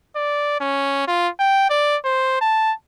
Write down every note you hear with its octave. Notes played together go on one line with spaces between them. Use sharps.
D5
C#4
F4
G5
D5
C5
A5